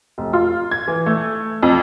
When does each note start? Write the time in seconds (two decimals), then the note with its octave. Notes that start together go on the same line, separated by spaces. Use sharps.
0.18 F1
0.33 F4
0.71 G#6
0.88 E3
1.06 A3
1.63 F2